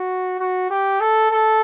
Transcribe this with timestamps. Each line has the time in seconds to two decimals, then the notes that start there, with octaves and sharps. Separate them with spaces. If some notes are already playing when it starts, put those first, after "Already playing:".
Already playing: F#4
0.40 F#4
0.70 G4
1.00 A4
1.31 A4